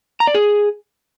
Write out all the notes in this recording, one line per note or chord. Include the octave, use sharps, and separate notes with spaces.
A#5
D5
G#4